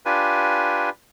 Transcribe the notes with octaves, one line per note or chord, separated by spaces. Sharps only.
D4 F4 G4 B4 G#5